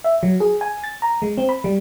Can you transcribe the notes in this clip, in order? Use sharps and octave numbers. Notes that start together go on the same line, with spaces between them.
E5
F#3
G#4
G#5
A6
A#5
G#3
C4
B5
G3